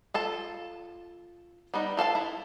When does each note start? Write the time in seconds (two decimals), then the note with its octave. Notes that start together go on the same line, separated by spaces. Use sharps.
0.14 F4 A4 A5
1.74 G3 B3 D#4
1.97 F4 A4 F5 A5
2.15 E4